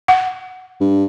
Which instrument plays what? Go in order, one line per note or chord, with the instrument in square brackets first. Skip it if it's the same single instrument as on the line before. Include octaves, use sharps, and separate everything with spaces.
[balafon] F#5
[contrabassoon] G2